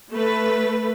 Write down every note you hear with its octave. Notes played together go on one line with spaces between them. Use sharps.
A3 B4